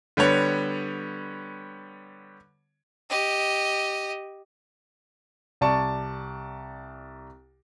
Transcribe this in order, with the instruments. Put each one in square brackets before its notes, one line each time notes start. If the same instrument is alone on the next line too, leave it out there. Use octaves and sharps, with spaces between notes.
[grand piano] D3 G3 B3 C#5
[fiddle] G4 D#5
[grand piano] C2 D5 A5 C#6